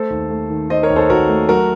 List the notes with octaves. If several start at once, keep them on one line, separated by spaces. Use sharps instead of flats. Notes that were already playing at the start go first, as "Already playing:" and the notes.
Already playing: A3 A4 C5
D#2
A3
D#3
D#3 C5 D#5
A#4 C#5
D#2
A4 C5
D#2 F#4 A#4
A3
F#3 F#4 A#4